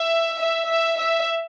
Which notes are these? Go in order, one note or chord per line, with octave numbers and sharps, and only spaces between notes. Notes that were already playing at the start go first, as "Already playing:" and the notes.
Already playing: E5
E5
E5
E5